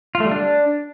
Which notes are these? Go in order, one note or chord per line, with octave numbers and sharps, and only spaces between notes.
F4
A3
G3
D4